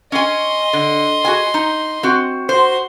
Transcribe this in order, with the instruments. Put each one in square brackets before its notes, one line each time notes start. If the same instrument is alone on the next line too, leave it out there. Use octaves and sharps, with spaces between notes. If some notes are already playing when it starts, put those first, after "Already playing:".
[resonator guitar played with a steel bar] C#4 G#5 [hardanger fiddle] D#5 C6
[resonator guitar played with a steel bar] D3
F#4 G#4 G#5
D#4
C4 F#4
[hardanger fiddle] F#4 C6 [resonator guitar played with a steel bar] C5